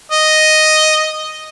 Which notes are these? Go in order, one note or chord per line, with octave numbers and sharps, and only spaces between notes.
D#5